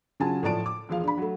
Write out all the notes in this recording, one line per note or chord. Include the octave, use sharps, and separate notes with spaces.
C#3 F#3 F4 G#5 A5
A2 F3 D5 A5 D7
D6
E1 F3 F5
D4 B5
F#3 A3